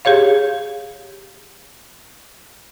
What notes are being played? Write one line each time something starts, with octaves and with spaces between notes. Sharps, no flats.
G4 G#4 C#5 F5